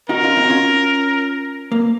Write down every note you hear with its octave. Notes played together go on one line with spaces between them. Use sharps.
D#4 F#4 A#4
C#4 F4
C4 D#4
F#4
C#4 F4
A#3